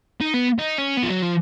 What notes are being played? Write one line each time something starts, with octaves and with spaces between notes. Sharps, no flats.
D#4
B3
D#4
C#4
B3
F3
F#3
F3